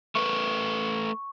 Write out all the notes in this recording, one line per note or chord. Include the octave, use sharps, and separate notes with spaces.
A3 A#4 B4 C#6